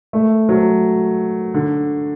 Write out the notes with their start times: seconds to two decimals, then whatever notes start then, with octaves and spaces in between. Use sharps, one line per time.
0.13 A3
0.49 F#3
1.54 D3